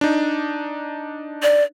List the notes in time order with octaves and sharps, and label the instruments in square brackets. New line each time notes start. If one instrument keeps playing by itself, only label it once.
[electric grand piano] D4 D#4
[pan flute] D5